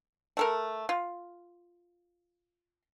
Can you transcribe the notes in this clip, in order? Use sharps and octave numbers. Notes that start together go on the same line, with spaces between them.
A3 A4 A#4
F4